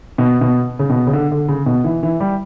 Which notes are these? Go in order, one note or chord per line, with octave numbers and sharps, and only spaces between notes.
B2
B2
C#3
B2
C#3
D3
D3
C#3
B2
E3
E3
G3